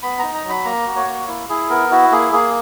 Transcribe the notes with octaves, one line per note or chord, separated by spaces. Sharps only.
B3 B5
D#4 A#5
A#5
F#3
B5
A#3 A#5
F#4
C#5
A#3
E4
E4 G#4
B3 A#4
E4 F#4
A#3 G#4
A#3 G#4